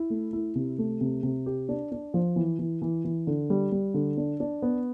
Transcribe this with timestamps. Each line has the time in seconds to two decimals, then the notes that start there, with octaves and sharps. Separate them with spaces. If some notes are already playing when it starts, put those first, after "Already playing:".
Already playing: E4
0.10 A3
0.33 E4
0.55 C3
0.78 A3
1.01 C3
1.23 C3
1.46 G4
1.69 D4
1.92 D4
2.14 F3
2.36 E3
2.59 E3
2.82 E3
3.05 E3
3.27 D3
3.50 G3
3.72 G3
3.94 D3
4.17 D4
4.40 D4
4.62 B3